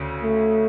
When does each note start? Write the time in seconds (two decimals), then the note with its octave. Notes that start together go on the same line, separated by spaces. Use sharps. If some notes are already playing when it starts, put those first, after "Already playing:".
Already playing: D2 C#3
0.23 A3